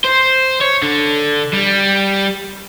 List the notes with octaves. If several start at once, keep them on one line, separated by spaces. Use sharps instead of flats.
C5
C#5
D3
G3